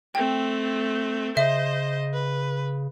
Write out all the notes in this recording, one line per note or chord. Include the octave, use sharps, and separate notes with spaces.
A3 C4 G5
C#3 C5 D#5 E5
B4